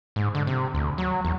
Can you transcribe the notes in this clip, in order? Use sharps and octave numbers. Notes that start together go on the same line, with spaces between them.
G#2
D3
C3
D2
F#3
E2